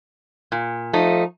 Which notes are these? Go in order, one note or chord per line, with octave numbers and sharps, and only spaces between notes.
A#2
F3 A3 D#4